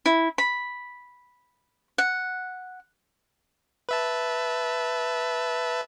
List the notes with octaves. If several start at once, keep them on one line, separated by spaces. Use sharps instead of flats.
E4
B5
F#5
B4 E5 A5